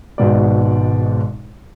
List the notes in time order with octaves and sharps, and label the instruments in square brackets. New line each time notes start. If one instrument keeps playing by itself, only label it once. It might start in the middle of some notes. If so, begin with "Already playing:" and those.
[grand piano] G#1 G#2 B2 D5